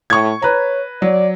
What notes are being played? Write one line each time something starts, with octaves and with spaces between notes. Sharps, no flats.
A2 C#6 G#6
B4 C#5 A#5
F#3 D5